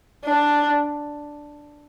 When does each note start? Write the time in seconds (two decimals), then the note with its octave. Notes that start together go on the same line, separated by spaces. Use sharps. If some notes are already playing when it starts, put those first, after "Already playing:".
0.25 D4